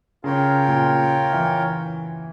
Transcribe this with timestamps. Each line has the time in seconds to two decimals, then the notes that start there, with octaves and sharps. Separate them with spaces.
0.23 C#3 F4 A#4 C#5 G5
0.68 A#2
1.33 E3